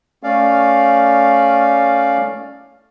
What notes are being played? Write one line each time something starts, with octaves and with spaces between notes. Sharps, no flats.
A3 C#4 D5 F5